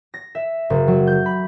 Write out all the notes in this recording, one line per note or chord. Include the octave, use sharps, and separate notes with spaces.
A#6
E5
F#1
F#3
G6
B5